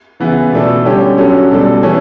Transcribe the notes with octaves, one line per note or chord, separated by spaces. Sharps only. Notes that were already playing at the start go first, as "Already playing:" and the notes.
C#3 E3 B3
B2 A3 D4 A4
D3 G3 C#4 G4
F#3 C#4 F#4 A4
B2 G3 D4 A4
E3 A3 C#4